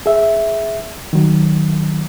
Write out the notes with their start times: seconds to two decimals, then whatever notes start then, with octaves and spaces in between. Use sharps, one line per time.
0.06 G#4 E5
1.13 D#3 F#3